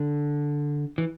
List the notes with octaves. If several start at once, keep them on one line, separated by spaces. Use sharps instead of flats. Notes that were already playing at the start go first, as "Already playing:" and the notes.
Already playing: D3
E3